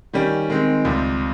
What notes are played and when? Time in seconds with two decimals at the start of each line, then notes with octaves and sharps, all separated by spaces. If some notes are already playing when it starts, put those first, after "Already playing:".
0.13 D#3 G3 C#4 G4
0.49 D#3 G#3 C4
0.85 C#2 C3 G3